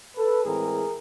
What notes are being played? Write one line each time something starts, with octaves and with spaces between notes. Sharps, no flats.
A4 B4
A2 E3 G#3 C4 G#4 A#4